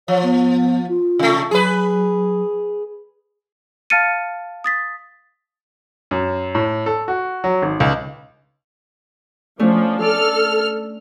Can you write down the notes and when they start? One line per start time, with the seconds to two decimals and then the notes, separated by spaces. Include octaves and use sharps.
0.08 F3 C#5
0.23 B3
0.88 F4
1.19 C3 A3
1.51 F#3 G#4 B4
3.90 F5 A5 F6 A6 C#7 D#7
4.64 D#6 A6 B6
6.11 F#2
6.55 A2
6.86 A4
7.08 F#4
7.44 F#3
7.62 G#1
7.80 C#2
9.59 F3 A3 C#4 D4
10.02 A4 D5 F6